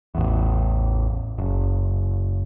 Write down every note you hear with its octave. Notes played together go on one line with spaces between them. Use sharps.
A1 E2
F#1